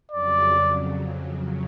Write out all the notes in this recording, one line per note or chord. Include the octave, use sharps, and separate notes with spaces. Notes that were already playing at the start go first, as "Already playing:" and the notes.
F2 C#3 F#3 D5